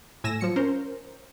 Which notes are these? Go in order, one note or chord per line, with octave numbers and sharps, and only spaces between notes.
A2 G#5 E6 A#6 E7
F3 F#3 C#7
C#4 A#4 C5